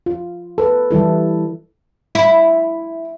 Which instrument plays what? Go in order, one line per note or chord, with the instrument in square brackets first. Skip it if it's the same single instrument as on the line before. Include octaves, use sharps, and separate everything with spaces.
[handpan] F4
A4 B4
E3 G3 E4 A4
[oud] E4